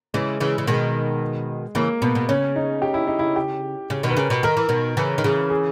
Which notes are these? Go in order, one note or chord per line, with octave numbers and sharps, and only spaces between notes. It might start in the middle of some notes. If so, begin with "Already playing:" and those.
C#3 E3 G#3
C#3 E3
C#3
B2 D#3 G#3
C#3 E3 A#3
B2 B3
B2
C#3 C#4
D#4
G4
E4
D#4
E4
G4
C#3
B2 D#3
B4
C#3 A#4
B2
D#3 A#4
E3
B2 D#3
C#3 E3 B4
D#3
C#3 E3 G#4
G#4